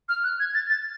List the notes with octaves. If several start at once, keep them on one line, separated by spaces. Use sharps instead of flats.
F6
F#6
G#6
A6
A6